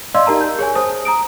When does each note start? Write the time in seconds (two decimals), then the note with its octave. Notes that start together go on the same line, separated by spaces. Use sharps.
0.14 D5 D#5 F5 C6 E6
0.26 D#4 G4 A#4 A5 A#5
0.41 G6
0.59 G#4 C#5 G#5
0.75 C5 A5 D#6
1.05 A#5 D#6 D7